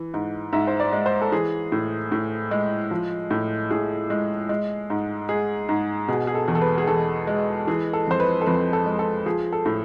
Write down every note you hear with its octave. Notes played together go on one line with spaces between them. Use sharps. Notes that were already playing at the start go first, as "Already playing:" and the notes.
Already playing: E3
G#2
G#2 E5
C5
D5
G#3
C5
A4
E3 G#4
A2
A2
G#3
F3
A2
A2 G#4
G#3
G#3
G#2
G#3 G#4
G#2
B2 G#4
G#4
A4
E2
A4
B4
G#4
E2 A4
G#3
E3 G#4
A4
F2 C5
B4
A4
F2 B4
A4
G#3
A4
F3 G#4
A4
A2